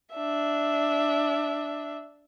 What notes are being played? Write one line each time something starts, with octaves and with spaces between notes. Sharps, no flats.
D4 E5